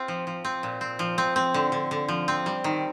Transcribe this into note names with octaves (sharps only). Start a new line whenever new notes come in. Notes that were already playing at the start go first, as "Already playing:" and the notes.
Already playing: C4 F4
F3
F3
C4
A#2
C4
F3
C4
C4
D3
D3
D3
F3
C4
G3
D#3